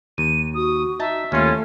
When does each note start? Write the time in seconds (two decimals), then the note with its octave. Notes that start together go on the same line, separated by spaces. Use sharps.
0.18 D#2 D#7
0.54 F#4 D#6
1.00 D#4 E5 A5
1.32 D#2 A3 C#4 E4 F4 F5